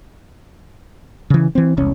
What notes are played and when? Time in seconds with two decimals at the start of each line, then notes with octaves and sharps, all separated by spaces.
1.30 C#3 E3
1.55 E3 C4
1.77 E1 C2 C#4